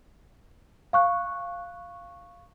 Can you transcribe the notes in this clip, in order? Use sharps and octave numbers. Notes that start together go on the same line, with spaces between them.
F5 C#6 F#6